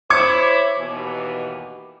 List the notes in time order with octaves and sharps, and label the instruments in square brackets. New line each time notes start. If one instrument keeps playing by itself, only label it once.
[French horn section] E4 C5 C#5 [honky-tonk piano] D6 G#6 C#7
[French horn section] D#2 B2 E3